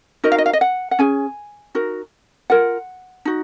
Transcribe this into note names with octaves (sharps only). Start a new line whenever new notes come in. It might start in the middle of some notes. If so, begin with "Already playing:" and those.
D#4 F#4 A#4 D#5
F5
D#5
F5
D#5
F#5
F#5
C#4 G#4 G#5
D#4 F#4 A#4
F4 A#4 F#5
D#4 F#4